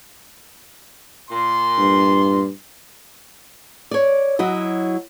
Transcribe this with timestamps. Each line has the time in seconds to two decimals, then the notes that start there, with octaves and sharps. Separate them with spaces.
1.31 A#2 C6
1.78 G2
3.91 C#5 D5
4.39 F#3 E4 F#4 D#5